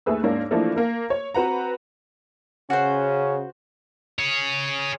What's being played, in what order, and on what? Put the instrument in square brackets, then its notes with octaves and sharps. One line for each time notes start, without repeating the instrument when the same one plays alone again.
[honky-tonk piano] D#2 A3 G#4 B4 E6
G#2 A#3 C#4 D4
E3 F3 A3 A#3 D4 A4
A#3 A#4
C#5
C4 F#4 B4 F#5 A#5
[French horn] C#3 [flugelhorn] C#4 [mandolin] F#4 C5
[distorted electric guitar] G#4 C#5